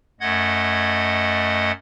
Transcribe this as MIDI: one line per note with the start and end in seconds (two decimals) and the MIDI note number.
0.21 1.72 42
0.21 1.72 57
0.21 1.72 75
0.21 1.72 78
0.21 1.72 92